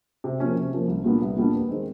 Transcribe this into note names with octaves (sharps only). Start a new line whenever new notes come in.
C3
F3 A#3 C#4
C3
F3 A#3 C#4
C2
A#2 G3 B3 D4
C2
A#2 G3 B3 D4
D#2
D#3 G#3 C4